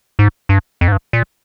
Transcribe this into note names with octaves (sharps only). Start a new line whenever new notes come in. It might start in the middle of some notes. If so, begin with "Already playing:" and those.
G#2
G2
F2
G#2
G2
A#2